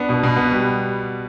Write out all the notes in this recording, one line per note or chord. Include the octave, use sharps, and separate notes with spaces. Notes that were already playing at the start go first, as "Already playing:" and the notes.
Already playing: B3 D4
B2
B2
B3
G3